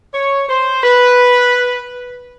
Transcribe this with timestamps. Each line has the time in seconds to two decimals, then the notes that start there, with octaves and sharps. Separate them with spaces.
0.14 C#5
0.49 C5
0.84 B4